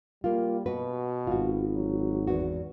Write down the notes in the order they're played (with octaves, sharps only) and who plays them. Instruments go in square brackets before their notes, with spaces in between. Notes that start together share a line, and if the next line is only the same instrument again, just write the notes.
[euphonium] G3 [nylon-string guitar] A#3 F4
[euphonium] B2 [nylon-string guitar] F#4 B4
[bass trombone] G#1 [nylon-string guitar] F4 F#4
[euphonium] F#3
[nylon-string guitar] E2 F#4